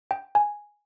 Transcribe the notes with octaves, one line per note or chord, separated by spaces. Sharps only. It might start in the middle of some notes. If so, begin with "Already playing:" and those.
G5
G#5